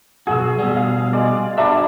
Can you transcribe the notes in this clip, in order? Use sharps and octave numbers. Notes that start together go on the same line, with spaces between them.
B1 F2 F#4 G#4 E6
B2 G3
F5
G#3 D5
D4 F#4 G4 D5 E5 B5